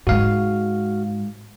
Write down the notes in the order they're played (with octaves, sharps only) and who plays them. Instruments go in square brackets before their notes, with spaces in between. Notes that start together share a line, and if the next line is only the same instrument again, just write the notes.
[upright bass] G#2 G#3 [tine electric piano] F#4 F5